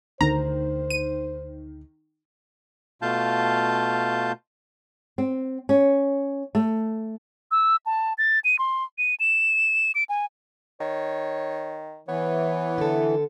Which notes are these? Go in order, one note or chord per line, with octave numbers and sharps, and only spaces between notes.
D2 D3 D#3 C5 A#5
D#7
B2 A3 F4 F5 A5 G6
C4
C#4
A3
E6
A5
A6
D#7
C6
D#7
E7
D7
G#5
D#3 C#5
E3 B3 C#5
D3 A4